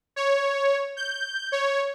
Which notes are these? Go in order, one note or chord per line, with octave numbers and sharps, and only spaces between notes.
C#5
G6
C#5